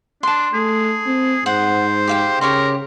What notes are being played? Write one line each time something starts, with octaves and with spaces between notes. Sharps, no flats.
D4 A5 C6
A3 G#4
C4
G#2 C5 F#5
G4 F5 G5
C#3 G4 A#4 C#5 C6